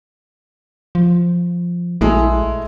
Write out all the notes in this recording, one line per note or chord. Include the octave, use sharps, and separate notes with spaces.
F3
A#1 G#3 A3 E4